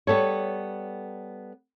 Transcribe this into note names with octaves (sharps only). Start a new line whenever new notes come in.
G3 B3 A4 C#5